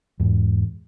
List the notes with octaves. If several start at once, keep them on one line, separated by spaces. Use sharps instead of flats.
E2 G#2